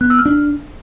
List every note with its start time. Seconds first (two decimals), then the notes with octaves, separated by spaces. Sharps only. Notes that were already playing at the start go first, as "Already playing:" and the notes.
0.01 B3 F#6
0.10 E6
0.19 F6
0.25 D4